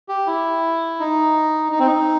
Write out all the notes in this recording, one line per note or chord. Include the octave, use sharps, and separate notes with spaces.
G4
E4
D#4
D#4
C4
D#4